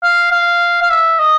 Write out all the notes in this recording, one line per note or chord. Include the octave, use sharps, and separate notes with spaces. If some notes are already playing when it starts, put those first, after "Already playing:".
F5
F5
F5
E5
D#5